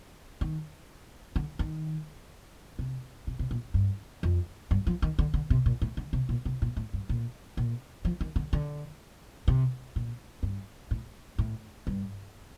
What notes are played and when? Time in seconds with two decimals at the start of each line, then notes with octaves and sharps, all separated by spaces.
0.41 D#3
1.36 D3
1.59 D#3
2.79 C3
3.27 C3
3.39 C3
3.51 A#2
3.74 G2
4.23 F2
4.71 G2
4.87 F3
5.02 D#3
5.19 D3
5.34 D3
5.50 C3
5.66 A#2
5.82 A2
5.97 D3
6.13 C3
6.29 A#2
6.45 C3
6.62 A#2
6.77 A2
6.93 G2
7.09 A#2
7.57 A#2
8.05 F3
8.21 D#3
8.36 D3
8.53 D3
9.48 C3
9.96 A#2
10.43 G2
10.91 A2
11.39 A2
11.87 G2